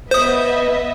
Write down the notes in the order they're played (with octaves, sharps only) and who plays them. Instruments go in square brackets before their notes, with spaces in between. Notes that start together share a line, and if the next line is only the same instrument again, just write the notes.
[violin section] B3 D#5 E5 [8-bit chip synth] C5 D#6